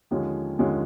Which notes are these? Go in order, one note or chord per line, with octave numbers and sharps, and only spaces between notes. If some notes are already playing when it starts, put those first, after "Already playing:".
D#2 D3 F3 G#3 C#4
D#2 D3 F3 G#3 C#4